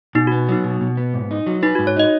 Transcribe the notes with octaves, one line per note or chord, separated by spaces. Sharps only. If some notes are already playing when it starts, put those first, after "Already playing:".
B2 D#4
F#4
B3
F#3 D#4
B2
B2
B3
G#2
D#4
F#3
D#4 B4
F#4
G#2
C#5
D#4 D#5